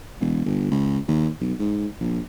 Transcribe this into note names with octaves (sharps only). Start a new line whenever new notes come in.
E1
G1
C#2
D#2
B1
G#2
A#1